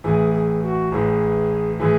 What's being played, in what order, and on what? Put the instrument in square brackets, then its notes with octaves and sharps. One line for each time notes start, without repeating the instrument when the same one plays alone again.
[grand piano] A1 A2 E3 [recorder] G#4
[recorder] G#4
F#4
[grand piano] A1 A2 E3 [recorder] G#4
[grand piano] A2 E3 [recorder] G#4